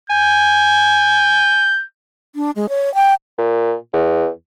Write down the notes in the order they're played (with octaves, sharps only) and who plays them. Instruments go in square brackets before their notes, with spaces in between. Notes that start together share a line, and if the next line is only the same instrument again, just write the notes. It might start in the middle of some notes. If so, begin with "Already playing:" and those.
[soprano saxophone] G#5 [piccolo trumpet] G6
[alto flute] D4
G#3
C#5
G5
[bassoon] A#2
E2